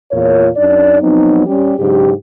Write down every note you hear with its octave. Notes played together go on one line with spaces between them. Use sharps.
E2 A#2 F4 A#4 C#5
F#2 D4 D#4 D5
F3 F#3 B3 C4 D#4
G3 C#4 G4
G#2 C#3 F#3 D4 G4